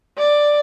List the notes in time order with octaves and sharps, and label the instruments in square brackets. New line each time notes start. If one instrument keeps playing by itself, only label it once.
[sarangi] D5